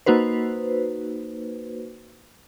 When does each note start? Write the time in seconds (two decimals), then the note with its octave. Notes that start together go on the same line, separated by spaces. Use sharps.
0.06 A#3 D#4 F#4 B4 C5